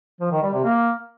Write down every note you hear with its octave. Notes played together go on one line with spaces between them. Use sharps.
F3
D#3
G3
C3
A#3